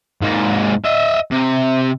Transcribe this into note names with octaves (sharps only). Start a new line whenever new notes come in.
G#2 A#3
D#5 E5
C3